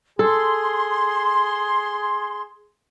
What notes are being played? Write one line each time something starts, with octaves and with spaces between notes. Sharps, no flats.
G#4 A4 C6